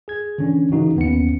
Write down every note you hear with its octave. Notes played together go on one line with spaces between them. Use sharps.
G#4 G#6
D3 E3 C#4 D4
C#3 E3 D#4 F#4
D#2 B3 C#4 C#7